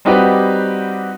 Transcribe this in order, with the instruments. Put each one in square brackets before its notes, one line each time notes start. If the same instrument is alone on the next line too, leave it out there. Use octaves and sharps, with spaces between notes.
[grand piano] G3 C4 D#4 F#4 G4 B4